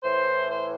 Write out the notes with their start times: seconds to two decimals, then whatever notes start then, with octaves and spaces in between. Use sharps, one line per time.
0.03 A2 E3 C5
0.50 C5